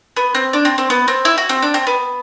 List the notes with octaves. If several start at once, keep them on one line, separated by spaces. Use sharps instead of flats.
B3
C4
D4
C4
C4
B3
C4
E4
F#4
C4
D4
C4
B3